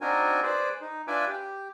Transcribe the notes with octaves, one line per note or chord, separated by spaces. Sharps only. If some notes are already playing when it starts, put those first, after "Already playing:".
C4 D4 D#4 F#4 A#4 G#5
G#4 B4 C5 D5
D#4
D4 F4 B4 E5 G#5 D6
G4